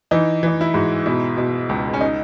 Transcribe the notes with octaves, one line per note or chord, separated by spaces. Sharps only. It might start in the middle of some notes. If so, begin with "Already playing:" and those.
E3 D#4
E3 D#4
E4
G#2 F#4
B2 E4
B2
C#2
C#4
D#4